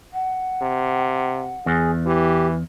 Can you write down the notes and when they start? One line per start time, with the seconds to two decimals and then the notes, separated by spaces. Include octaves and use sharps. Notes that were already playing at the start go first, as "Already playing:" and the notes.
0.13 F#5
0.62 C3
1.66 E2 G#4
2.06 E3 G4